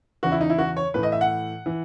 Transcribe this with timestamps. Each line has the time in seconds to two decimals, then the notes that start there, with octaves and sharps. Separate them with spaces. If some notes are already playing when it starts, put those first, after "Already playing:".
0.23 E2 C#3 E3 F#4
0.32 E4
0.41 D#4
0.50 E4
0.58 F#4
0.77 C#5
0.94 A2 E3 B4
1.03 D#5
1.12 E5
1.21 F#5
1.66 E3